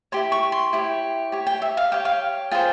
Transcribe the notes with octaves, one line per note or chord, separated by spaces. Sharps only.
E4 G4 C#5 C6
C#6
C6
E4 G4 C#5
G4 C#5
G5
E5
F5
G4 C#5 G5
F5
F4 G#4 C5 G5